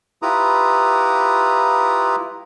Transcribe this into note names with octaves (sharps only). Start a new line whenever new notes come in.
E4 F4 G4 B4 A#5 D#6